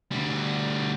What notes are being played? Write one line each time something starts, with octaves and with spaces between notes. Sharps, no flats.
D2 G3